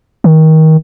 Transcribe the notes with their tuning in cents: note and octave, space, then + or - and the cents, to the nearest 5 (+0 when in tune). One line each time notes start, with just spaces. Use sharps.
D#3 +25